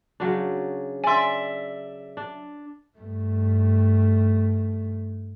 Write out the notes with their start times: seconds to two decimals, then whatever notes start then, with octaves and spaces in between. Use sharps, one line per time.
0.20 C#3 F#3 D4
1.04 D5 E5 G#5 C6
2.17 D4
2.98 G2 A3